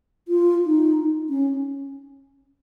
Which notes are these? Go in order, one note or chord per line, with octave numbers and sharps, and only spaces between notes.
F4
D#4
C#4